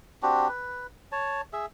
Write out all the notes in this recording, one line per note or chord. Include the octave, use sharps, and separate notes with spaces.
C4 D4 F#4 G4
B4
C#5 A5
G#4 E5